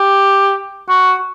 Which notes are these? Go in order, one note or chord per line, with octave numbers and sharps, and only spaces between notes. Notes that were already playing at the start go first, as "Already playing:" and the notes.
Already playing: G4
F#4